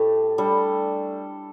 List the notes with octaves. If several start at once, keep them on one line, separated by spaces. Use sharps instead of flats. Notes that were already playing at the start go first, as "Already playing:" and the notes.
Already playing: A2 A3 G4
G3 D4 A4